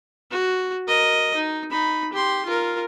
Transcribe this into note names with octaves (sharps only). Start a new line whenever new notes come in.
F#4
A#4 D#5
D#4
D#4 B5
G4 C6
F4 A#4